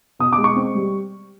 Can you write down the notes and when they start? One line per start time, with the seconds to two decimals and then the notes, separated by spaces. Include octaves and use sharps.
0.19 B2 D#6
0.33 D6
0.38 G#3
0.44 C#6
0.56 C4
0.75 G3